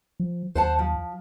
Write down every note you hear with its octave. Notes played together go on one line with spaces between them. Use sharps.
F3
D#2 C5 F#5 A5
F3